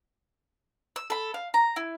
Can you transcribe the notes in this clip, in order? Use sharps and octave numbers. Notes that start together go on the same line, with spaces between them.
E6
A4 B5
F5
A#5
E4